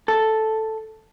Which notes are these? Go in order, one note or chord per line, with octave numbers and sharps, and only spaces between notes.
A4